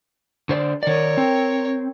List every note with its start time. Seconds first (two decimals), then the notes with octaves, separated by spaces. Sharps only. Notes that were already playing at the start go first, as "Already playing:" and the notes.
0.49 D3 C5 D5
0.83 D#3 A#4 C#5 D5
1.17 C4